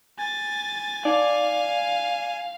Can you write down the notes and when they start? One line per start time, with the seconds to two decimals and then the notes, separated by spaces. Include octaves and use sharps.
0.19 G#5 A6
1.05 D#4 D5 F5